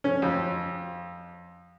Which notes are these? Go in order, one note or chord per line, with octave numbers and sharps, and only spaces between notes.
C#4
F2